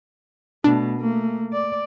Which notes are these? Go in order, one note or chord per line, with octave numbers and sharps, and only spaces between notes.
B2 A3 D4
A3 A#3
D5